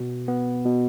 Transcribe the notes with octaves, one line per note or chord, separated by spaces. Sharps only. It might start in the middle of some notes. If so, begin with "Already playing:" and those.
Already playing: B2
B3
B2